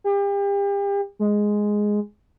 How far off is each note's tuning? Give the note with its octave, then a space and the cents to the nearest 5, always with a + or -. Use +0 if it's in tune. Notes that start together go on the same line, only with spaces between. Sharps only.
G4 +35
G#3 +0